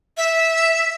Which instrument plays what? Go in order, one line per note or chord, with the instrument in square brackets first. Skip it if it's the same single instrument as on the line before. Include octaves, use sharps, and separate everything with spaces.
[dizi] E5